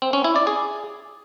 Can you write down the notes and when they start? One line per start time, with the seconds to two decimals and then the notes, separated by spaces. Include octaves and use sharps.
0.02 C4
0.13 C#4
0.24 E4
0.36 D5
0.47 G#4